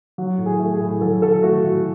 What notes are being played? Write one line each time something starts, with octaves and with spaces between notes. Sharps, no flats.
F#3
A2
G#4
A3
G#4
A2
F#3 A4
A2 A4
A3 F#4
A2 F#4